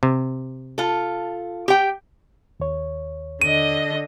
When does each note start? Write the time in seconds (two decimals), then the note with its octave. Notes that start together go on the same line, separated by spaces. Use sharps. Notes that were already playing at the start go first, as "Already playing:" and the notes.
0.03 C3
0.78 F4 A4
1.68 G4 G5
2.60 D#2 C#5
3.42 D3 D#5 D#7